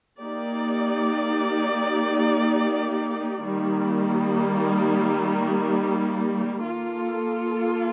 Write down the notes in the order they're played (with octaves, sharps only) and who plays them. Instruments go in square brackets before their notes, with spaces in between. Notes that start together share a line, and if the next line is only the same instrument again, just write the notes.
[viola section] A#3 D#4 G4 D5
D#3 G3 A#3
A#3 F4 A4